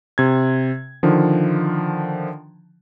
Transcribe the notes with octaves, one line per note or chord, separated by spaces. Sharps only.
C3 G#6
D3 D#3 F3